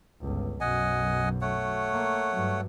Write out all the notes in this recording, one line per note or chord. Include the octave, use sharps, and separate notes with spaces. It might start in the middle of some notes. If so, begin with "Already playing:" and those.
G1 C#2
B1 F#2 D#5 F#5 G#5
A3 C#5 F#5
A#3
G2 F#3